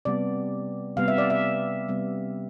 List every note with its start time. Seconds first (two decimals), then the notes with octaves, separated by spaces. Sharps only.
0.05 C3 G3 B3 D5
0.97 C3 G3 B3 F5
1.08 E5
1.18 D5
1.30 E5
1.88 C3 G3 B3